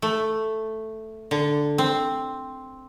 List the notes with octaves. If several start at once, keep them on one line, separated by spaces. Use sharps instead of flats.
A3
D3
C4